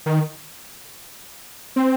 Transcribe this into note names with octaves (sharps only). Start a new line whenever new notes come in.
D#3
C4